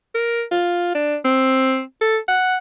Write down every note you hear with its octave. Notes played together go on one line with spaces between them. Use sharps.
A#4
F4
D4
C4
A4
F#5